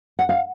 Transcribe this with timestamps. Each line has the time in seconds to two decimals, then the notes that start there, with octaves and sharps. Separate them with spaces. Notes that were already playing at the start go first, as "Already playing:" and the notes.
0.19 F#5
0.29 F5